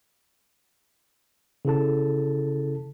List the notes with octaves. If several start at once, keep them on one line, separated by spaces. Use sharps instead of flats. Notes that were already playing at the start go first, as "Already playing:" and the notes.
C#3 E4 A4 A5